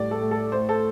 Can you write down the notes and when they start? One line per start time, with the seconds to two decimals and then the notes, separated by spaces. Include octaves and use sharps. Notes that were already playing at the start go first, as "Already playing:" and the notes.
Already playing: A2 G3 D5
0.11 A4
0.21 A3
0.31 A4
0.52 A3 C5
0.69 A4